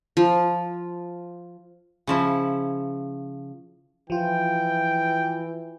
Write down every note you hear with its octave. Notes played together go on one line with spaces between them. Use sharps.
F3
C#3 F3 E4
E3 F3 F4 G5